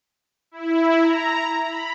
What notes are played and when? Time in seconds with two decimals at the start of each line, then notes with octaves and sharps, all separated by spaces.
0.51 E4
1.01 A#5
1.62 B5